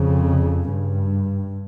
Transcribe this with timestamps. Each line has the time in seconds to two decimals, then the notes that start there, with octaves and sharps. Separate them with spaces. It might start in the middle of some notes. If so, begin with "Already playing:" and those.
Already playing: F2 C#3
0.69 G2